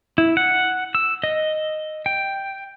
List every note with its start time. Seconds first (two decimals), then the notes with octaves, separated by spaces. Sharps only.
0.18 E4
0.37 F#5
0.95 E6
1.24 D#5
2.06 G5